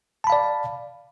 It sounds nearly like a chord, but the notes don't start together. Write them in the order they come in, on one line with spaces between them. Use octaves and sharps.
A5 B5 F5 D5